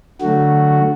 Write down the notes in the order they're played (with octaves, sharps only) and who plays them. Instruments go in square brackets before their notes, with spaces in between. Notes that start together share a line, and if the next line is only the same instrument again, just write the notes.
[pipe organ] D3 F#3 A3 F#4